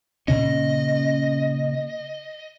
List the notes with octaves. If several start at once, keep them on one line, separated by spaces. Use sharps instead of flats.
A#2 C#3 C#4 D#5